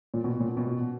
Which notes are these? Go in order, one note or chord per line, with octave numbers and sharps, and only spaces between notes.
A#2
B2
A#2
B2